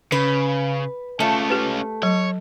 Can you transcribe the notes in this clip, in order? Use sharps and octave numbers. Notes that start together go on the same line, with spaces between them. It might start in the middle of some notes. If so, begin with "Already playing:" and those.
C#3 B4
A3 C#4 F4 A5
G4 B4
F#3 C#5